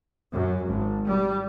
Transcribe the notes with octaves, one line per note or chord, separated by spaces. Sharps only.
F#2
G#1
G3